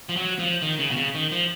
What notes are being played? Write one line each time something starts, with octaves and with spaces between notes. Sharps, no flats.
F3
F#3
F3
D#3
C#3
B2
C#3
D#3
F3